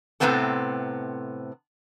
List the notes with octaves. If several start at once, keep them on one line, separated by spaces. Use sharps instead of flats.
A2 C3 G3 B3 C4 A4